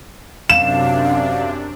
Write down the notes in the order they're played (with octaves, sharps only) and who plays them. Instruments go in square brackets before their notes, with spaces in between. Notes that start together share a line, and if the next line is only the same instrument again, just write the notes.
[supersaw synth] F#2 C3 D4 [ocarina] F5 [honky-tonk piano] E7